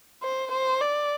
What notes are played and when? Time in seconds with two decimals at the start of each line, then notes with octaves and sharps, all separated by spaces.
0.22 C5
0.52 C5
0.81 D5